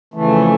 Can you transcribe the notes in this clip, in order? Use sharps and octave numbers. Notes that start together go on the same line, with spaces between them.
F2 C#3 E3 A3